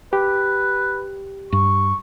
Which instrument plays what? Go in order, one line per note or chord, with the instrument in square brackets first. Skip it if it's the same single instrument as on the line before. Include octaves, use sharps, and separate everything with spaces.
[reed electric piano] G4 [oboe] B4
[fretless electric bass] G2 [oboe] C#6